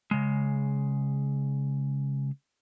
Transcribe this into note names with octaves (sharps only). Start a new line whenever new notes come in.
C#3 G#3